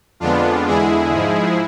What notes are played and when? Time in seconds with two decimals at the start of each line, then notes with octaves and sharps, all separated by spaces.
0.20 F2 D3 G#3 B3 D4 F4
0.67 E2 D3 G#3 E4 G#4
1.14 G#2 F3 G#3